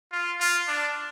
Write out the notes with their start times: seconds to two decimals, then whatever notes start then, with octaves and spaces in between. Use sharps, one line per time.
0.12 F4
0.40 F4
0.68 D4